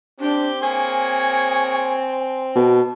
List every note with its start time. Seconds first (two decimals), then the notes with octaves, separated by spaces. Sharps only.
0.20 C4 D4 G4
0.61 A#3 G#4 C#5 G#5
2.56 B2 A5